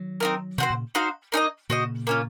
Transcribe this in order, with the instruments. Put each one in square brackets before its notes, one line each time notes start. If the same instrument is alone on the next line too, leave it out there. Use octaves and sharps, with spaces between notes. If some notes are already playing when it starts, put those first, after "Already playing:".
Already playing: [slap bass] D#3 F#3
[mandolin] C4 D#4 A#4
[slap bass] C3 D#3 [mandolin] C4 F#4 C5
[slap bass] A#2 C#3
[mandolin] D#4 F#4 C5 F5
A#3 D#4 A4 D#5
[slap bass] A#2 C#3 [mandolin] F#4 C5 D#5
[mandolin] A#3 C#4 F4